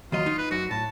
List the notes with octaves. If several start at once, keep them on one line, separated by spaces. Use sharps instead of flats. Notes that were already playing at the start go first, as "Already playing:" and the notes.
D#2 F#3 F4 D#5
D#4
B4
F#2 F#4
A2 A5